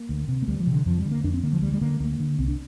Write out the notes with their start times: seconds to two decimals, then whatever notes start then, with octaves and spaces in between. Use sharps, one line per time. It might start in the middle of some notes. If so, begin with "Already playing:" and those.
Already playing: A#3
0.09 D2
0.28 C3
0.42 A#3
0.48 D2 G3
0.60 F3
0.67 C3
0.73 D3
0.86 F2 F3
0.98 G3
1.05 D3
1.11 A#3
1.24 F2 D4
1.34 C4
1.43 D3 A#3
1.53 F3
1.62 D2 G3
1.74 G3
1.81 D3 A#3
2.00 D2 A#3
2.20 D3
2.39 C2 C4
2.48 D4